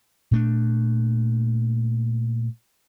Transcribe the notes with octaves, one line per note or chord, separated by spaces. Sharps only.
A#2 A3 D4